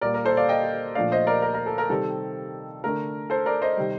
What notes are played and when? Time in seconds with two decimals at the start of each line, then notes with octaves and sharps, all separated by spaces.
0.01 A#2 G3 A#3 A#4 D5
0.14 A#4
0.25 A4 C5
0.37 D5 F5
0.49 D#5 G5
0.95 A#2 F3 A3 D4 D5 F5
1.12 C5 D#5
1.27 A#4 D5
1.42 A#4
1.54 A#4
1.66 A4
1.78 A#4
1.89 C3 D#3 G3 C4 A4
2.84 D3 A3 D4 A#4
3.30 A4 C5
3.46 A#4 D5
3.62 C5 D#5
3.77 C3 D#3 G3